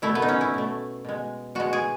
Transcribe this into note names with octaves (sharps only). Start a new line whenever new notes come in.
B2 A3 E4
B3
D#4
C#4
E4
B2 A3
B2 G#3
B2 G#3 F#4
G#4